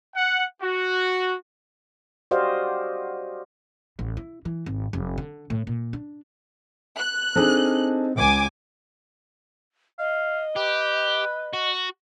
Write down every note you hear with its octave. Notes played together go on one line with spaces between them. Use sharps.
F#5
F#4
F#4 G4 C5 D5 D#5 F5
A1
E4
E3
G#1
F1
D3
A2
A#2
D4
F#6
C4 D4 D#4 G#4 A4
C#2 G#5 D6
D#5 F5
G4 B4
F#4